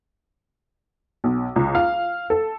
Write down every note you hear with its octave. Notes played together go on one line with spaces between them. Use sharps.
B1
C#2
F5
A4